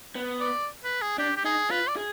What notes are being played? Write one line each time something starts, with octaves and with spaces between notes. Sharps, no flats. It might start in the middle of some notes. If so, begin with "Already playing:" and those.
B3
D5
B4
G#4
D4 G4
G4
D#4 G#4
F4 B4
D5
G#4